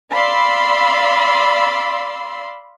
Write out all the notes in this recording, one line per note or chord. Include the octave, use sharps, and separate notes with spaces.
D5 F5 B5 C6 E6